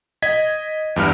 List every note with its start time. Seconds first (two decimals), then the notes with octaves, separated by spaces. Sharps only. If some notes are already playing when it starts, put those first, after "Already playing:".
0.22 D#5 G#6 B6
0.96 E2 G2 E4 F6